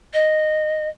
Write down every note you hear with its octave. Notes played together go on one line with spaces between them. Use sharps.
D#5